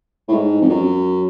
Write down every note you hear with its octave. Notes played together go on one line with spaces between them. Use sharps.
A2
G#2
F2
F#2